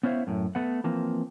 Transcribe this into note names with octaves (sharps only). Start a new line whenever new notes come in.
B3 C#4 E4 C5 E5 F5
F#2 A2
A3 B3 F#5
E3 F3 A#3 C4